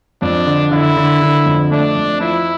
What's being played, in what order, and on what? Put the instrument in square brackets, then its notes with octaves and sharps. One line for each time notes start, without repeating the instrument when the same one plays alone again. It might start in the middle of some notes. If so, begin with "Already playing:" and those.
[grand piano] F2 [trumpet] D4
[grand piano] D3
[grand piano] D3 [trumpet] E4
[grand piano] D3
D3
F2
[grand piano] A3 [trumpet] D4
[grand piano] F2
[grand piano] F3 [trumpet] E4